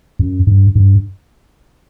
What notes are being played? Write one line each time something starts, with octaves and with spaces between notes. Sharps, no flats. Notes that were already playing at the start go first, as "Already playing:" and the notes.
F#2
G2
G2